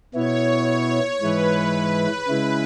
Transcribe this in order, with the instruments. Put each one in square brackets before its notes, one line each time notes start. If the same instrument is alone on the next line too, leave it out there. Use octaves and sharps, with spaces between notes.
[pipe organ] B2 B3 E4 [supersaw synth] C#5
[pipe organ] G#2 E3 G#3 E4 [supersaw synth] B4
[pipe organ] C#3 G#3 E4